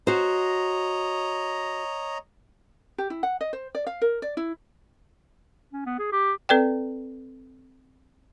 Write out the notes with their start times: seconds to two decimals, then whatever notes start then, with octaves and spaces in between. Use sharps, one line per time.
0.07 F#4 C5 C#5 D#5 A#5
2.98 G4
3.10 E4
3.23 F#5
3.41 D#5
3.53 C5
3.75 D5
3.87 F5
4.02 A#4
4.22 D5
4.37 E4
5.73 C#4
5.86 B3
5.99 G#4
6.12 G4
6.49 C4 A4 B4 D5 G5